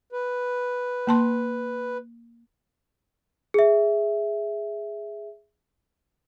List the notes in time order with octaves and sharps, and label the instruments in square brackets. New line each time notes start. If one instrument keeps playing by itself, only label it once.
[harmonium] B4
[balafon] A#3 A5 C6
[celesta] G#4 E5